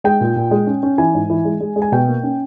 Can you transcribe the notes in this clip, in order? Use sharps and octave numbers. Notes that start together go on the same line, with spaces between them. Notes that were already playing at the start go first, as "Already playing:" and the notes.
G#3 G5
A#2
A#2
G#3
C#4
C#4
E3 G#5
G#2
E3
G#3
G#3
G#3
G#5
B2 G5
A#3
C#4